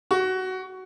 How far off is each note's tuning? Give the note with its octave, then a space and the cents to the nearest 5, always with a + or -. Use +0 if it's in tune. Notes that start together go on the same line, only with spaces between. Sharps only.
F#4 +15